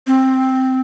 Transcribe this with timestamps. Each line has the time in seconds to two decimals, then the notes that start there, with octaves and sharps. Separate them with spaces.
0.07 C4